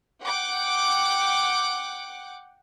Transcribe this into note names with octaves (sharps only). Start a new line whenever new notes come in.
F#5 G5 D6